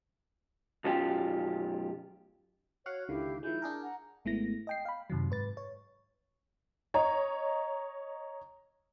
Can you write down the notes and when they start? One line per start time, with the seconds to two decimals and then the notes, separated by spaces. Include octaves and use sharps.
0.84 B1 F#2 F4 G4
2.86 F#4 C#5 F5 F#5
3.08 C#2 D3 D#3 E4 G4 F5
3.43 D#3 F3 G#3 E4 G6
3.62 D4 G#4 A#4
3.82 F#5 A#5
4.25 G#1 G#3 A3 B3 E4 A#6
4.67 D#5 G5 C7
4.85 F5 B5
5.10 F#2 C3 D#3 F#3
5.30 G#2 B4 A6
5.57 C#5
6.94 C#5 D#5 A#5